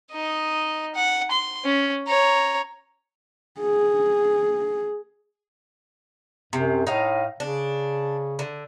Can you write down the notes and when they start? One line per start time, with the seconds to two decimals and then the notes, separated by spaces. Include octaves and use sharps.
0.12 D#4 D#5
0.95 F#5
1.31 C6
1.64 C#4
2.07 C#5 A#5
3.60 G#4
6.53 F#2 C3
6.87 A2 D#4 F5
7.40 C#3 D4
8.39 D3